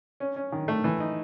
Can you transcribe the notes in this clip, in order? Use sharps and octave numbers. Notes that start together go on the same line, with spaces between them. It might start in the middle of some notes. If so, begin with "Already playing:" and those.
C#4
C#4
D#3
A3
E3
D#4